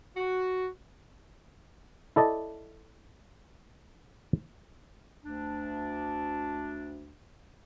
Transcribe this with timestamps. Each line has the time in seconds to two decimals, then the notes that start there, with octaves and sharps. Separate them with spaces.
0.17 F#4
2.16 E4 A4 D5 D#5 A5
5.25 D2 D4